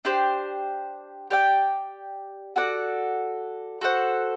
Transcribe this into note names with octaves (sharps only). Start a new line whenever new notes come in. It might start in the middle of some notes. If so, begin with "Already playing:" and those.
D4 G4 C5
G4 D5 G5
F#4 A4 D5 F#5
F#4 A4 C5 F#5